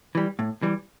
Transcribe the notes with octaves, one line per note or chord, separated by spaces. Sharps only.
E3 G3
A2
E3 G3